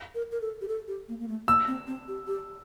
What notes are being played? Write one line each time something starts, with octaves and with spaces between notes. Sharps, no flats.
A#4
A#4
A4
G4
A4
G4
A#3
A#3
A3
A#3 E6
C4
C4
G4
G4